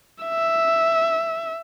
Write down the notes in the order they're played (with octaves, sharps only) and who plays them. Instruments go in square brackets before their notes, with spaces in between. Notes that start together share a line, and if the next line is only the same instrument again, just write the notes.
[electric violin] E5